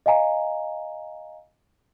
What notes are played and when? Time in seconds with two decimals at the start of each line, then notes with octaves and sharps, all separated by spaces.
0.06 D#5 F5 G#5 A#5